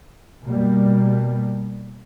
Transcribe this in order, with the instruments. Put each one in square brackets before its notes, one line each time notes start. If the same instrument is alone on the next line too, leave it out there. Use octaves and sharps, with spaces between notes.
[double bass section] B2 G3 A#3